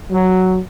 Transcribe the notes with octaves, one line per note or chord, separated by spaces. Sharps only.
F#3